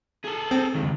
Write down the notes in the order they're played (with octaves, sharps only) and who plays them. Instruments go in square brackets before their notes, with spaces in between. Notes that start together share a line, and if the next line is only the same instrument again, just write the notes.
[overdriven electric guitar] G#4 A4
[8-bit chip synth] C4
[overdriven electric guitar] C#2 D#3